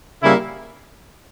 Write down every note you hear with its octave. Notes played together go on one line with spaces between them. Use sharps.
C#3 G3 A#3 E4